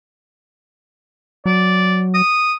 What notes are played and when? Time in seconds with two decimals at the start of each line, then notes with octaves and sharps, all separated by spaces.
1.46 F#3 D5
2.14 D#6